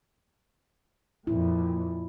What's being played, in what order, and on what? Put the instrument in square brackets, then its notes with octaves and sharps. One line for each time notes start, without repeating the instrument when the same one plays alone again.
[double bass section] F2 A#2 [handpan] E4